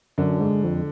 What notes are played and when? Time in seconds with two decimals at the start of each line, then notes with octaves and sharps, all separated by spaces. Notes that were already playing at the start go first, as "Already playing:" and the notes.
0.18 F#2 D3
0.40 G#2
0.64 F2